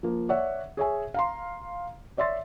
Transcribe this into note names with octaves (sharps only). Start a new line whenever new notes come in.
F3 A#3
C#5 D5 E5 F#5
G#4 C#5 E5 G#5
F5 A#5 C6
C#5 D5 E5 C6 A6